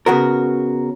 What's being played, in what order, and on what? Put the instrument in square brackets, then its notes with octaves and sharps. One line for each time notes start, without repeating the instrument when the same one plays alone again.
[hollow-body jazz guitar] C#3 B3 F#4 A#4